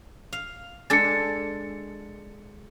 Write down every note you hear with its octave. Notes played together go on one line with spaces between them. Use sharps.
F5
G#3 D4 A4 A6 C#7